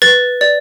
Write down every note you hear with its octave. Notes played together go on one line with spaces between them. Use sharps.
B4 A6
D5